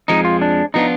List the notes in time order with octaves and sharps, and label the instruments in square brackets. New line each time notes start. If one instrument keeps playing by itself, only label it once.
[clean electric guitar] F2 F3 G#3 [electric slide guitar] D#4
[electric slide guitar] F4
D4
[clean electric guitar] F3 B3 D4 F4 [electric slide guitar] D#4